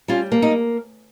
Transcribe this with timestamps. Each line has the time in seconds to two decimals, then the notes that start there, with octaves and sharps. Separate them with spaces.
0.08 G3 C#4 F4
0.32 A#3
0.42 D#4